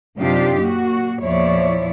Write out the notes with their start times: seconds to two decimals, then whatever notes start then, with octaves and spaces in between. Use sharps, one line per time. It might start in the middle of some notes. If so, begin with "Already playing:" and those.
0.18 F#2 C3 D4 D#4 F4 G4
0.60 A#2 A#3 F#4
1.22 E2 A#2 F3 E4 C#5 D5